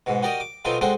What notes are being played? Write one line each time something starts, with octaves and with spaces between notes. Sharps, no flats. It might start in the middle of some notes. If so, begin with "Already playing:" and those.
G#2 B2
F#4 G4 A#4 D5 D#5
D6
B2 F#3 C4 D#4 F4 A4
G#3 C4 D4 F#4 A4 C5